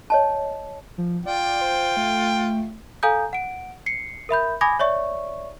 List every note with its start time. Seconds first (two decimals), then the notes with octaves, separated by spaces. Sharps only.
0.10 C#5 D#5 A5
0.98 F3
1.26 F4 D5 G5
1.61 C5
1.97 A3
3.03 A4 F5 G#5 A#5 D#6 G6
3.33 F#5 D7
3.86 C7 C#7
4.29 A#4 E5 B5 G6
4.61 G#5 B5 D6 D#6 G#6 A#6
4.79 C#5 D5 E5 C#6